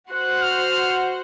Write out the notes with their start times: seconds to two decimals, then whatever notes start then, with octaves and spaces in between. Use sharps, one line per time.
0.11 F#4 C5 F#5 F#6
0.42 F6